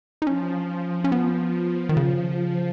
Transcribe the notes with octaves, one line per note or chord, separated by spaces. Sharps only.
D#4
F3 C#4
C#4
B3
F3
D#3
C#3